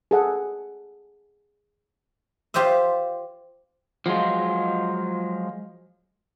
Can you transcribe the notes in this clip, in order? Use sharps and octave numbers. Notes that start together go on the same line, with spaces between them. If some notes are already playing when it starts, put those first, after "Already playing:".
G#4 A4 F#5
F4 G4 C5 D#5 E5
F3 F#3 G#3 F4